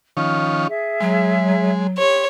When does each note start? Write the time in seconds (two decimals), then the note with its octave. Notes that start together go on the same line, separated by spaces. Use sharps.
0.17 D#3 F3 C#4 F6
0.68 G#4 D#5 E5
1.00 F#3 G#3
1.98 G4 C#5 C6